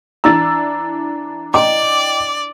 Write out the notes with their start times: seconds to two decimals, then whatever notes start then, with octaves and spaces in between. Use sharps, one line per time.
0.24 E3 D4 A#5 E6 A6
1.54 D5 D#5 G5 D6